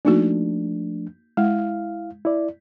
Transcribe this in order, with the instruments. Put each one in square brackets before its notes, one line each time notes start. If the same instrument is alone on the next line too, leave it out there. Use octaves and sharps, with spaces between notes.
[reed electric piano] F3 A3 D4 [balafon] A#3 D#4 F#4
[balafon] G#3 [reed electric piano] E4 F5
[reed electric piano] E4 D5